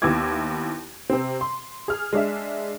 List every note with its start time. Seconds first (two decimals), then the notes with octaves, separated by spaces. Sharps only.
0.02 D#2 B3 E4 D6 G#6
1.10 C3 C4
1.41 C6
1.88 G#4 F6
2.13 G#3 D4 E5